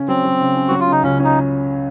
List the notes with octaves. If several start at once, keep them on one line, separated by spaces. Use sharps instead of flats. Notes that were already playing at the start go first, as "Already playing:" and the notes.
Already playing: C#3 C#4
F#3 C4
F#3
C#3
C#4
F#3 F#4
F4
C#3 D#4
C#2 C#4
C#4 D#4